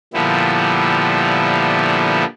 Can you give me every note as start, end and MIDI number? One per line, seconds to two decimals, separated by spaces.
0.13 2.24 46
0.13 2.24 50
0.13 2.24 53
0.13 2.24 55
0.13 2.24 59
0.13 2.24 64